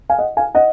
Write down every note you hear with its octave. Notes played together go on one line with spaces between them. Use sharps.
F5 G#5
D#5 F#5
F5 G#5
D#5 F#5